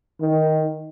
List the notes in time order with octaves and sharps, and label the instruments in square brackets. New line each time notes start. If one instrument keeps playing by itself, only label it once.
[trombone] D#3